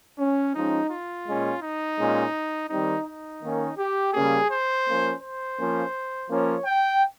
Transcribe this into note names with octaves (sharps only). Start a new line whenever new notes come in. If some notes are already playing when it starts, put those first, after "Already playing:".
C#4
F3 G#3 C#4 D#4
F4
A#2 G#3 C#4
D#4
A#2 G#3 C#4
D#3 G3 C4 D#4
D#4
D#3 A#3 C#4
G4
C#3 G3 A#3 C#4 G#4
C5
F3 A#3 C#4
C5
F3 A#3 C#4
F3 A#3 C#4 C#5
G5